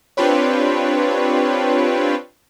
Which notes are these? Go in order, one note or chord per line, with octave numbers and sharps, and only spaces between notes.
C4 D4 F4 G4 B4 C#5